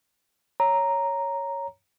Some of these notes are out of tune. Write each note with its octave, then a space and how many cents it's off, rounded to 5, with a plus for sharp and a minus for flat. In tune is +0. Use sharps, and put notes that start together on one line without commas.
C#5 +0 A#5 +0